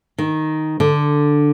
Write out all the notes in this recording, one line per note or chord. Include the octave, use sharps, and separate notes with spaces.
D#3
D3